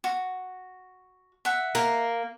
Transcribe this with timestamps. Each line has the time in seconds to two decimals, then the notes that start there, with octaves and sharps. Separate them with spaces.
0.04 F#4
1.45 E5 F#5
1.75 A#3